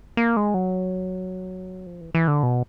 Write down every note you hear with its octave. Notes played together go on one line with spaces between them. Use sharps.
A#3
G#3
F#3
F3
E3
E3
D3
B2